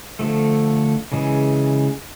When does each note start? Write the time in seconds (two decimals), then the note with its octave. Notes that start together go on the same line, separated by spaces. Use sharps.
0.19 D3 F3 A3
1.12 C#3 E3 G#3